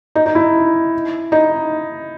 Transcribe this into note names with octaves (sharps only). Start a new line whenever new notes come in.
D#4
D#4
E4
D#4